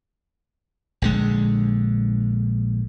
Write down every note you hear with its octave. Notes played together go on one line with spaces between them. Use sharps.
A#1 D3 G#3